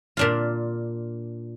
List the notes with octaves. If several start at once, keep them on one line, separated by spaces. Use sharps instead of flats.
A#2 D4 F4